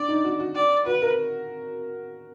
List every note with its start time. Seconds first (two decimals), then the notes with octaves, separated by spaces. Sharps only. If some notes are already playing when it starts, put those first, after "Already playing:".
Already playing: D4 D5
0.08 D#4
0.24 F#4
0.40 F#4
0.55 D5
0.86 F#4 B4
1.02 A#4